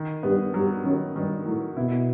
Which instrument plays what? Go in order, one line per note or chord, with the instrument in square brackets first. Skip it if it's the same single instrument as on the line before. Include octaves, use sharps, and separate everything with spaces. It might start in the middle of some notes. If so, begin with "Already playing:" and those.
Already playing: [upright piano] D#3
[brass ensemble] G2 [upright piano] B3
[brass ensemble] G2 [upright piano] F#3
[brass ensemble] F#2 [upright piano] D#3
[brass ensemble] G2 [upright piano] D#3
[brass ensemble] A2 [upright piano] F#3
[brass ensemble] B2 [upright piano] E4